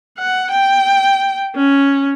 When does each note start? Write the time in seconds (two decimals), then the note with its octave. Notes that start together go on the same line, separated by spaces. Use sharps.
0.18 F#5
0.51 G5
1.55 C#4